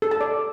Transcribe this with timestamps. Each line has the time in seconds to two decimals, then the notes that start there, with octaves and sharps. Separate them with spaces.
0.02 A4
0.11 A5
0.21 D5